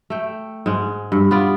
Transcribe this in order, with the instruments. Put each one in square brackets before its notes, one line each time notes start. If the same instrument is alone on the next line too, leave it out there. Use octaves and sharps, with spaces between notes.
[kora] A3 G5
G#2 G#3
G2
B3 F4 D5